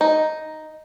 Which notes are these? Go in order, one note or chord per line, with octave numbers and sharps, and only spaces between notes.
D#4